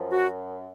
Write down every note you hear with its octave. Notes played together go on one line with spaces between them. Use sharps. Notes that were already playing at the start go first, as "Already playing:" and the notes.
Already playing: F#2 F3
F#4